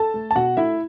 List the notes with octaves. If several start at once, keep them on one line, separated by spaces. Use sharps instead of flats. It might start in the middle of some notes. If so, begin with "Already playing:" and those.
Already playing: A4 A5
A3
A5
B2 F#4 F#5
A3 E4 E5